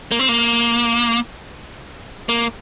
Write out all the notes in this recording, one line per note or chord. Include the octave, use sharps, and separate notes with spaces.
A#3
C4
A#3
A#3